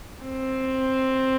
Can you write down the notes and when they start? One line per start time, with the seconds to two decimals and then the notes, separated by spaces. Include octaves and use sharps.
0.25 C4